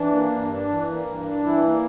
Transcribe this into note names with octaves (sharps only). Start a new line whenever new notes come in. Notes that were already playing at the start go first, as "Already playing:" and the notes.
Already playing: E3 D4
A#3
G2
D4
E3
A#3
G2
D4
E3 E4
A#3